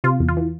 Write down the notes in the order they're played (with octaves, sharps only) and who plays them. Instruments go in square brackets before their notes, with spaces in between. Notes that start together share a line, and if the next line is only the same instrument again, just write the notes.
[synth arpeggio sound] C3 F4
E2
F4
E3